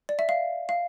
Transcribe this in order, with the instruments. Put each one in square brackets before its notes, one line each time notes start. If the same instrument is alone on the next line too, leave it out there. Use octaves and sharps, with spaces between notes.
[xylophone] D5
E5
F5
F5